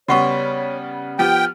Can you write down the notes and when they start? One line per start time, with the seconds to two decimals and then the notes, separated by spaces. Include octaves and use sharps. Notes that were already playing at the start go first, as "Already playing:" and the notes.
0.08 C#3 G3 B3 F#4 C#5 F#5 C#6
1.19 F3 B3 G4 G5 F6